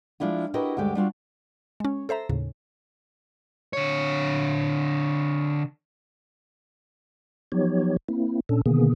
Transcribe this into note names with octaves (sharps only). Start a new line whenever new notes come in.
F3 G#3 D4 E4 F4
E4 F#4 G4 A#4 B4 D#5
D2 G2 D3 G#3 G4 D5
G3 D4 F4 F#4
G#3 C#4
A4 C5 E5 A#5
D#2 A2 C#3
D3 C#5
F3 F#3 B3 D#4 G4 C#5
A#3 C4 E4
A#2 C#4 D4 A4
B2 D3 D#3 A#3 B3 G#4